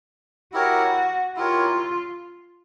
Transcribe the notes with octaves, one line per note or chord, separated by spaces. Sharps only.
E4 F#4 G4 A#4 C#5
E4 F4 G4 A#4 C#5